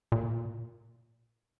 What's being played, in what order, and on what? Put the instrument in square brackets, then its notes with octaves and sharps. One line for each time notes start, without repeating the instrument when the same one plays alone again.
[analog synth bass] A#2